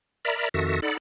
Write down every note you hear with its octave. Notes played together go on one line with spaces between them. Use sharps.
A#4 D5 E5 A#5 B5
F2 D#3 F#4 A4 E5 A#6
D#4 A4 D5 F#5 B5